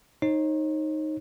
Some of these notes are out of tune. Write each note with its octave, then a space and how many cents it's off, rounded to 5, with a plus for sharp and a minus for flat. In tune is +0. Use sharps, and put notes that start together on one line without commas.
D#4 +0 C#5 -45